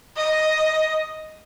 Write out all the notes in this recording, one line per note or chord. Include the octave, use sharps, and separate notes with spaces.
D#5